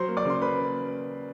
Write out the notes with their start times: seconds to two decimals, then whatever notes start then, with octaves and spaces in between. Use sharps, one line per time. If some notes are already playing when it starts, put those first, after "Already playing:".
Already playing: F#3 C5 C6
0.08 A#3
0.17 D5 D6
0.25 C#3 C6
0.42 A#3 B4 B5